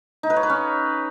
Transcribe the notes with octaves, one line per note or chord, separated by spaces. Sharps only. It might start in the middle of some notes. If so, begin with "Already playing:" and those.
D#4
B4
C#5
B4
C#4